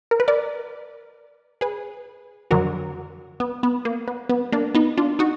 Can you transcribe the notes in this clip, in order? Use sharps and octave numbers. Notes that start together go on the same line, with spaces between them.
A#4
B4
A#4 D5
G#4 B4
F2 D3 F#3 F#4 A#4
B3
B3
A#3
B3
B3
A#3 D4
B3 D#4
D4 F4
D#4 F#4